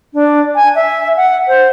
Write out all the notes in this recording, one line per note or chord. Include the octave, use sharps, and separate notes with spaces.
D4
G#5
E5
F#5
C5